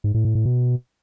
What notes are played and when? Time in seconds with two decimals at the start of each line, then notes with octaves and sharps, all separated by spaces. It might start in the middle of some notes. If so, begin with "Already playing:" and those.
0.04 G#2
0.14 A2
0.25 A2
0.35 A2
0.45 B2